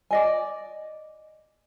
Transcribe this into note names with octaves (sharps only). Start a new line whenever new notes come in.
D5 D#5 G#5